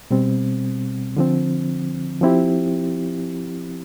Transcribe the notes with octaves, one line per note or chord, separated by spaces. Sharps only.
B2 G3 C4
D3 F3 C4
F3 C4 E4 G4